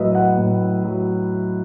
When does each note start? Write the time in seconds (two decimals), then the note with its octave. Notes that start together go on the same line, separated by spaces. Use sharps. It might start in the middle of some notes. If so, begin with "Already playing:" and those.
Already playing: A2 F#3 B4 D#5 E5
0.15 F#5
0.38 A2
0.84 F#3